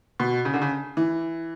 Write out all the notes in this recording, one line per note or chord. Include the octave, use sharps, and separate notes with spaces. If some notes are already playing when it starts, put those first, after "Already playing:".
B2
C#3
D3
C#3
E3